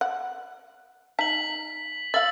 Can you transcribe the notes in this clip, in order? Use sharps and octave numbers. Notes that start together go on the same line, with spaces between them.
F#5
D#4 A#5 B6 F#7
E5 F5 E6 A6 F#7